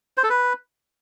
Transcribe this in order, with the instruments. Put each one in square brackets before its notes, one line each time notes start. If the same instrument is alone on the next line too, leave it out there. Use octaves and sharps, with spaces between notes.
[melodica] C5
A4
B4